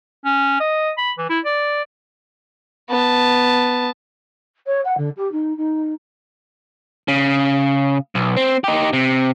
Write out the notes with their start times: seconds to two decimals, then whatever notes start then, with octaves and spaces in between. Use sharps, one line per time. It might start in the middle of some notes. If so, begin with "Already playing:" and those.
0.25 C#4
0.60 D#5
0.98 B5
1.18 E3
1.30 E4
1.45 D5
2.90 B3 A5
4.67 C#5
4.85 F#5
4.97 D3
5.17 G4
5.32 D#4
5.57 D#4
7.08 C#3
8.15 B1
8.37 C4
8.64 D#4 G4
8.93 C3